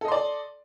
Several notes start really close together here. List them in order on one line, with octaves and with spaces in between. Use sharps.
A4 D#5 C6 D5